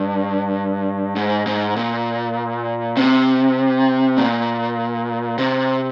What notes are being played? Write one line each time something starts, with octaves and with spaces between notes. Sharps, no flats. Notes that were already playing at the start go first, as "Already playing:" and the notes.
Already playing: G2
G#2
G#2
A#2
C3
A#2
C3